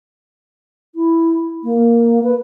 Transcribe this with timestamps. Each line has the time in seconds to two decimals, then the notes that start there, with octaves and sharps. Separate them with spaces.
0.95 E4
1.64 A#3
2.23 B4